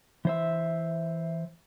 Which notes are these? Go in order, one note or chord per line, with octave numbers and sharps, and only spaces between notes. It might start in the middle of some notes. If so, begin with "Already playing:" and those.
E3 C5 E5